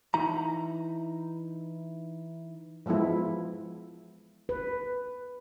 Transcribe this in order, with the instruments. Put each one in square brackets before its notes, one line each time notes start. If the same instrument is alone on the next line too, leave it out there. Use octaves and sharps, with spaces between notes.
[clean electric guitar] E3 D#4 E4 A#5
[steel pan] E3 F3 G#3 B3 E4
[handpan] B4